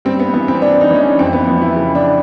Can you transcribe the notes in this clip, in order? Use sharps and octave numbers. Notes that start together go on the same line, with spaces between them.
G2 C4
B3
E3 B3
C4
E3 D4
D#4
E3 C#4
D4
F2 C4
B3
F3 B3
E4
C#3
D4